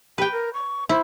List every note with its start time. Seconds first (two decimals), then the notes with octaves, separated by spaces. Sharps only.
0.18 G4 B4 G5
0.32 A#4
0.54 C#6
0.89 E4 C5